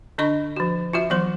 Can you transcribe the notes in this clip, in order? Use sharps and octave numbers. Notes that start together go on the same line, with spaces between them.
D3 D4 D#5 B5 C#6
F3 F#4
F4 F#4 E5
E3 F#3 B3 C5 C6